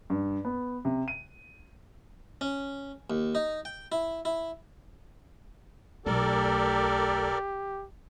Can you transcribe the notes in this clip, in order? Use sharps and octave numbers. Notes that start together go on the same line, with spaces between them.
G2
B3
C3
D#7
C#4
D#2
D#4
G5
E4
E4
B1 A3 G4 A4 A#4 D5